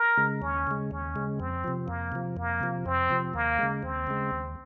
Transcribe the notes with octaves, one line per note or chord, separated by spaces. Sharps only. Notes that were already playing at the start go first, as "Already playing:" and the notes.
Already playing: A#4
C#3 G#3
D#2 C#4
C#3 G#3
D#2 C#4
C#3 G#3
F2 C4
C3 F3
F2 A#3
C3 F3
F2 A#3
C3 F3
F2 C4
C3 F3
D#2 A#3
C#3 G#3
D#2 C4
C#3 G#3
D#2